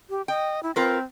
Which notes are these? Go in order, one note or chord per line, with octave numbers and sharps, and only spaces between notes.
G4
D#5 G5
E4
C4 F4 A#4 B4